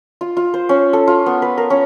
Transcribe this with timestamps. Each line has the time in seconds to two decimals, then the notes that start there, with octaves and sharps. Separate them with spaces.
0.21 F4
0.37 F4
0.54 C5
0.69 C#4
0.93 A4
1.07 F4
1.26 B3
1.42 B4
1.57 A#4
1.70 C#4